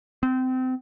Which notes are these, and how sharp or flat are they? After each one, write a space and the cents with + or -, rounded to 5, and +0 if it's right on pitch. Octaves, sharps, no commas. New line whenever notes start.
C4 -25